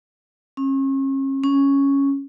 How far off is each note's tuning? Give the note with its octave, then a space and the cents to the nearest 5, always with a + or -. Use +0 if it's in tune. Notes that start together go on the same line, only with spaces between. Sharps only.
C#4 -40
C#4 +0